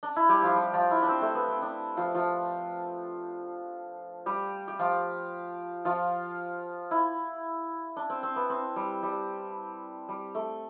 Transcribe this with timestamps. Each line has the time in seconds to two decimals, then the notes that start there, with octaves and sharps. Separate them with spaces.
0.03 D4
0.16 E4
0.29 G3 G4
0.42 F3 F4
0.56 G3 G4
0.73 F3 F4
0.91 E4
1.02 D4
1.09 C4
1.22 A3
1.35 B3
1.48 C4
1.62 D4
1.97 F3 F4
2.14 F3 F4
4.26 G3 G4
4.68 G4
4.79 F3 F4
5.85 F3 F4
6.91 E4
7.96 D4
8.10 C4
8.23 C4
8.36 B3
8.50 C4
8.76 G3
9.03 G3
10.09 G3
10.35 A3